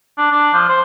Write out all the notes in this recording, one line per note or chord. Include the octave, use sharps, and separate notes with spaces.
D4
D4
F3
C5